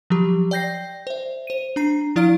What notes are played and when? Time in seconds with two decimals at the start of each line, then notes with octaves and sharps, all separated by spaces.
0.10 F3 F#3 G4
0.51 D5 G5 G6 A#6 C7
1.07 C5 E5
1.47 C5 D#7
1.76 D4 A#5 C7
2.16 F3 E4 D5 F5 F6 D7